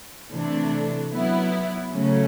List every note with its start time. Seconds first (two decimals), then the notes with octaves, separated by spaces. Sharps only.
0.31 C3 E3 A3 D4
1.12 F#3 B3 E4
1.93 C#3 F#3 A3 C#4